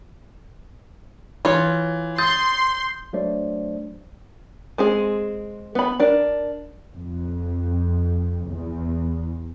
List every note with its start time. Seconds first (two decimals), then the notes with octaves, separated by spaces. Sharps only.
1.45 E3 F4 C#5
2.18 C6 D#6 G6 A6
3.13 F#3 A3 D4 C5 D5
4.78 G#3 C4 G#4
5.75 B3 B5
6.00 D4 A#4
6.93 F2
8.48 E2